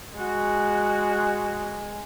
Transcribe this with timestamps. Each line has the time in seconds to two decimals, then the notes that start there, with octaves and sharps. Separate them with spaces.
0.18 G#3 F#4